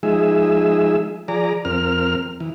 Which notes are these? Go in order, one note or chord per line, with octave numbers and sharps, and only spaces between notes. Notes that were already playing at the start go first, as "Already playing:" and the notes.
F3 G#3 D#4 G#4 E5
F3 G#4 D5 A#5
F2 C4 A#4 F6
E3